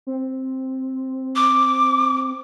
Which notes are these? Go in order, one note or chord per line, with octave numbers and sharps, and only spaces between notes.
C4
D6